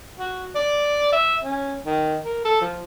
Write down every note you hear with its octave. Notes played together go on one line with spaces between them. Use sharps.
F#4
D5
E5
C#4
D#3
A#4
A4
F3